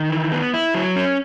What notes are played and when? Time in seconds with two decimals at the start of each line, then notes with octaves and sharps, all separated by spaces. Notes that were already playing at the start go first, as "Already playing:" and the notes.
Already playing: D#3
0.10 E3
0.32 B3
0.54 E4
0.75 F#3
0.96 C#4